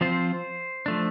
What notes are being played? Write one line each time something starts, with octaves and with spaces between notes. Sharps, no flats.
F3 C4 F4 C5
F3 A3 D4